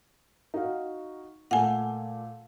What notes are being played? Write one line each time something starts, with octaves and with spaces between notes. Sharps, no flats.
D#4 F#4 F5
A#2 A3 F#5 G#5